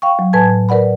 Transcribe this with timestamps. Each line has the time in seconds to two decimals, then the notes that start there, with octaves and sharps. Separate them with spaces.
0.02 F5 G5 C#6
0.19 F#3
0.33 A2 B4 G#5 A5 G#6
0.69 A#4 B4 D5 F#5 B5